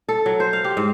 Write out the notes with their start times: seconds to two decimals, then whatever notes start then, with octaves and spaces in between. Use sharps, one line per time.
0.09 A4
0.26 F#3
0.40 C5
0.53 F5
0.64 G4
0.77 G#2